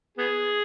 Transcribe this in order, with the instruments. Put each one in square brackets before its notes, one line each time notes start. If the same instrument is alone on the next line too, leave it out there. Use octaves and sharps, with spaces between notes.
[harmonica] B3 G#4